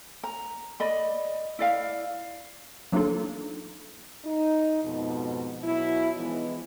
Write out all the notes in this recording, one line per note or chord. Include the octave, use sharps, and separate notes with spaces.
A#5
D5 D#5 B5
E4 D5 F5
F#3 A#3 D4 D#4 F4 A4
D#4
F2 G#2 B2
B2 F#3 E4
E3 F3 G#3 B3 D#4